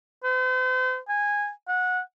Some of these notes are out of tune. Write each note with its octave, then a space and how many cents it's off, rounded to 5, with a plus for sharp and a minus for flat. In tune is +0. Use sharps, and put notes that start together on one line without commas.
C5 -40
G#5 -15
F#5 -20